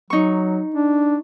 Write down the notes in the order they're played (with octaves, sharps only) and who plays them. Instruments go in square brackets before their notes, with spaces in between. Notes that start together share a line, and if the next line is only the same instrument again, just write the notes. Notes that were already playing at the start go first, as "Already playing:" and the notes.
[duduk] F#3 [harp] D#4 C#6
[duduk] D4